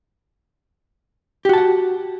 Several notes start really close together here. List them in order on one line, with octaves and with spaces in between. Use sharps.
G4 F#4 A5 F#5